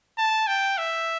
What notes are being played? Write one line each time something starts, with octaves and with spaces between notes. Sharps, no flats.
A5
G5
E5